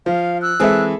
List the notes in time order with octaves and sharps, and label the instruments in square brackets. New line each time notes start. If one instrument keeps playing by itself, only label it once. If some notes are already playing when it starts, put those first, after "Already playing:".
[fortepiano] F3 [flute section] F5
[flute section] E6 F#6
[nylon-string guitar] E3 G#3 C4 [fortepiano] G#4 A4 E5